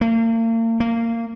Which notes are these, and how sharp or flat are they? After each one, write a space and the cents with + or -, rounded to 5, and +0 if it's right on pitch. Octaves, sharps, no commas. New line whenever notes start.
A#3 -40
A#3 -20